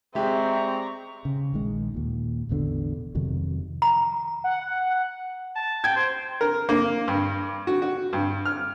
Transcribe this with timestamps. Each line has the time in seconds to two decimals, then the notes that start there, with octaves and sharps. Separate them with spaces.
0.15 G#3 C4 G4 D5 E5 A#5 C#6
1.25 C#3
1.53 A#1 D#3 G#3
1.94 D#2 A#2
2.49 A1 E2 B2 D3
3.15 F2 C3 D#3 F#3
3.82 A#5
4.44 F#5
5.56 A5
5.84 G5 G#6
5.96 C5
6.41 A#4
6.69 A#3
7.08 G2
7.67 F#4
7.82 F#4
8.13 G2
8.45 F6